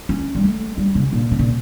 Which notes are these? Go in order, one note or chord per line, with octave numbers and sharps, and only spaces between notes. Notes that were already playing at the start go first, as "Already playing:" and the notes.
C#4
G3
A3
G3
C#3
A#2
C#3
A#2